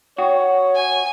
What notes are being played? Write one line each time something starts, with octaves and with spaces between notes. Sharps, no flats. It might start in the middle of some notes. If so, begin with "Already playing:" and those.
F#4 C#5 F#5 G5 D#6
G#5